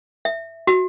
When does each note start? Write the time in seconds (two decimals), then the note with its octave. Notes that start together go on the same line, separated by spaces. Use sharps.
0.25 E5
0.67 F#4